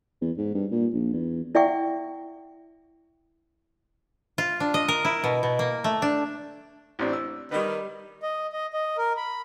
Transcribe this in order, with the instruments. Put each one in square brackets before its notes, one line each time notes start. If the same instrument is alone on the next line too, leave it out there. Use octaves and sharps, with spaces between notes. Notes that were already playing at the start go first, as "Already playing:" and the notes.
[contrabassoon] E2
G#2
G2
A#2
A#1
E2
[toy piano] E4 D5 E5 F#5 G5 C#6
[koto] F4
D4
D#5
A#4
E4
B2
B2
A#3
A3
D4
[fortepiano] A1 C4 D4
E6
[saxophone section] D#3 [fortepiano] G3 B4
[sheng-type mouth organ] D#5
D#5
D#5
A#4
B5